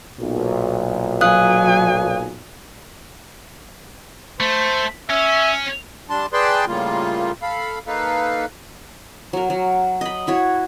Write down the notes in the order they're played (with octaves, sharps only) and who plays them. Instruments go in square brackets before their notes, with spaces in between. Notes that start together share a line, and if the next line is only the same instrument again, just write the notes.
[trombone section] B1 A#2
[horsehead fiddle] F#3 G#5 [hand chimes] F5 D#6 F#6
[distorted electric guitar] A3 [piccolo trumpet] C5
[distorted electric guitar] C#4 [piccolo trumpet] E5
[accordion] G3 D4 A5 C6
G#4 B4 D5 G5 A5 C6
A2 C#3 G3 A#3 F4
A4 F5 B5
A#3 D#4 A4 B4 F5
[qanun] F#3 A#4
F#3
D#5 B5
E4 F#4 C#5